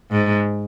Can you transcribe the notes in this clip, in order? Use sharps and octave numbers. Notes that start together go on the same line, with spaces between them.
G#2